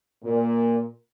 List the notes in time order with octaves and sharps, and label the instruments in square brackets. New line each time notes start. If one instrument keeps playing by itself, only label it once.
[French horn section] A#2